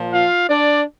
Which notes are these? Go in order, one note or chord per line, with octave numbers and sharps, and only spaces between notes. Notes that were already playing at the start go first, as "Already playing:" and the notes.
Already playing: A#2 F3
F4 F5
D4 D5